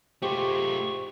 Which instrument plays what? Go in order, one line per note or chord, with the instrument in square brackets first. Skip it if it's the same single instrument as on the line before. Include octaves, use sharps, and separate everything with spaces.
[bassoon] G#2 [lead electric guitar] A3 F4 [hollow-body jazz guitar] G4 [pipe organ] C#6